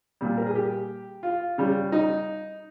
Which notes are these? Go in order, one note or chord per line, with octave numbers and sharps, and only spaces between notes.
A#2 G3
A#4
G#4
G4
F4
C#3 G3
D#4